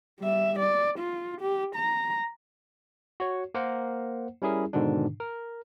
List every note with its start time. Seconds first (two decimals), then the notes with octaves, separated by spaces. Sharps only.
0.20 G3 E5
0.59 D5
0.99 F4
1.41 G4
1.76 A#5
3.20 F#4 C#5
3.54 A#3 A#4 C5 F#5
4.42 G3 C#4 E4 G#4 A#4
4.73 G#2 B2 D3 D#3 D4
5.20 A#4